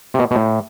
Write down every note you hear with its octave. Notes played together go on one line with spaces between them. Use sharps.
C3
B2
B2
A2